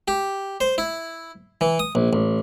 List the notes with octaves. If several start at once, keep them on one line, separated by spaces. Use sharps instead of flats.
G4
C5
E4
E3
D#6
A#1
A1